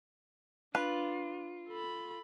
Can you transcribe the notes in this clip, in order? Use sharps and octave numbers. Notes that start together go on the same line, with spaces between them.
D4 F4 B4
A4 B5